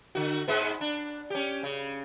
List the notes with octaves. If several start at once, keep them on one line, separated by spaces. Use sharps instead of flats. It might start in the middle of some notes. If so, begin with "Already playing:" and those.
D3 F#4
G#2 G#3 B3
D4
C#4 G4
C#3